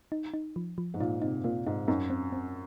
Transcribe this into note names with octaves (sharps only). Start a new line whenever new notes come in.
D#4
D#4
F3
F3
G#2
A#2 D#4
C3 D#4
A#2 A#3
G#2 D#4
F#2 D#4
C4
C4